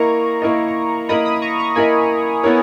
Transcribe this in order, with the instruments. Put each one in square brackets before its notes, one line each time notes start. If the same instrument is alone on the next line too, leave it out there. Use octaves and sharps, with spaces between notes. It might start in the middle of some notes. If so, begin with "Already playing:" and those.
Already playing: [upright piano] A#3 E4 A#4 D#5 [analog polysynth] A#5 C#6
[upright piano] A#3 E4 A#4 D#5
[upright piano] A#3 E4 A#4 D#5 [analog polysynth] B5 D#6
[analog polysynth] B5 D#6
A#5 C#6
A#5 C#6
[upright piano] A#3 E4 A#4 D#5 [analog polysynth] G#5 B5
[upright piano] B3 E4 A#4 C#5